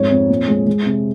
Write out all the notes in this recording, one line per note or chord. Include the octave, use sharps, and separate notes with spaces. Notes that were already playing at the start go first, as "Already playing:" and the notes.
Already playing: F2 G#2 C#5
F2
A#2
G#3
G#3
C3